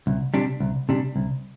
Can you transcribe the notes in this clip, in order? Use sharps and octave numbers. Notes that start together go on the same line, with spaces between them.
C2
C3 G3 D4
C2
C3 G3 D4
C2